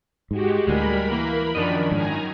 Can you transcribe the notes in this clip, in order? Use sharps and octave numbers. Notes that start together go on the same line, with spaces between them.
G#2 G#3 F#4 G4
D2 A2 G3 G#3 A#4 B5
E3 A#3
F#2 D#3 F3 D4 D#5
G#2 G#5 A#5